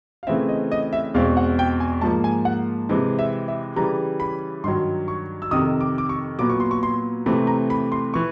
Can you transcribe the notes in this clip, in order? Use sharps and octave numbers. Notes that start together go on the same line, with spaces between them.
F5
C#3 E3 A3 C4 E5
D#5
D#5
E5
E2 B2 G#3 C4 F5
F#5
G5
G#5
G#2 F3 A#3 A5
G#5
F#5
C3 E3 G#3 C4
E5
E5
C#3 E3 G3 A#5
B5
G2 D#3 F#3 C6
C#6
E6
F2 C3 D#3 D#6
D6
D6
C#6
A#2 F#3 B3 D6
C#6
C6
C#6
C6
C3 E3 A3 C4 B5
A#5
B5
C6
E3 C#6